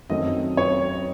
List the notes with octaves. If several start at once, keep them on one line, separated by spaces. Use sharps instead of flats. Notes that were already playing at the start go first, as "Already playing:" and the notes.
F#2 D#3 F#3 A3 C4 D#5
C#5